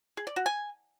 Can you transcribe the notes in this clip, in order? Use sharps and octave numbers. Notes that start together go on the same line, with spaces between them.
G#4
D5
F#4
G#5